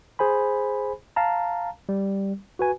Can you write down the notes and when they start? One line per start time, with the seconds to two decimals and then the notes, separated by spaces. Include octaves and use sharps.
0.19 G#4 C5 G#5 B5
1.16 F5 A5 A#5
1.89 G3
2.59 F#4 B4 G#5